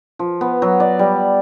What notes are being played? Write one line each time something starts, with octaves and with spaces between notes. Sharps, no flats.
F3
B3
F#3
D5
G3